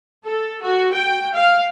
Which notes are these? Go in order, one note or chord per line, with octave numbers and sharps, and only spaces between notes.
A4
F#4
G5
F5